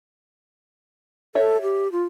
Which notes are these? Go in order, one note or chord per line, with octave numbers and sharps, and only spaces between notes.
A4 C#5 E5
G4
F4